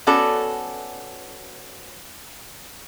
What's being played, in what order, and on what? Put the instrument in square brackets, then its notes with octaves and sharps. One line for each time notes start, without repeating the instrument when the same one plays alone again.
[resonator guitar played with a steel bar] B3 C#4 F#4 A4 D5